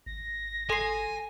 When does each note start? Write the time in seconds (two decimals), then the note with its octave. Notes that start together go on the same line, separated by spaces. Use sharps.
0.06 G#1 A#6
0.70 A4 G#5 C6 C7